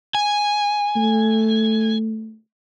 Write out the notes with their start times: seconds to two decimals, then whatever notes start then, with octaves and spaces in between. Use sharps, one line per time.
0.15 G#5
0.96 A3